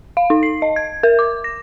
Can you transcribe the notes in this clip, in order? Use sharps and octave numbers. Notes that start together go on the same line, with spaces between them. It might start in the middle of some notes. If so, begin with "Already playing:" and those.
F5
D#4
C7
D#5
G#6
A#4
D6
A#6